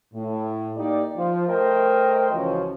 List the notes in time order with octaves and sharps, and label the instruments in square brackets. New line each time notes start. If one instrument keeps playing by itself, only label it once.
[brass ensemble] A2
A#3 D#4 G4 D5
F3
A3 A#4 C5 D#5 G5
C#2 E3 F3 C#4 F#4